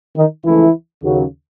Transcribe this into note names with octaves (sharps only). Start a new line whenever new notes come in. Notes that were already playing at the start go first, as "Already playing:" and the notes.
D#3 D#4
C#2 C#3 E3 F3 A3 E4
D#2 C#3 F#3